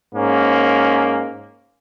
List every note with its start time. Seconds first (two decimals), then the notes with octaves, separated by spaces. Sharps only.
0.14 G#2 A#3 C#4